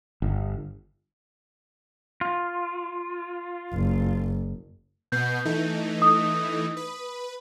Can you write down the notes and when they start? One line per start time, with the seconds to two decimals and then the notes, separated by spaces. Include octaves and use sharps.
0.22 G1
2.21 F4
3.73 F#1
5.12 B2 B3 G6 C7
5.45 E3 A3 D#4
6.02 D#6
6.77 B4